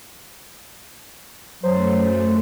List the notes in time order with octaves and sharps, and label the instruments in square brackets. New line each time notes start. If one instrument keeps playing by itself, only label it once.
[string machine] F#2 A3 [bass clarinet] F#3 [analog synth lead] C5